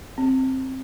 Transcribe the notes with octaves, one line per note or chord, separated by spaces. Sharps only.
C4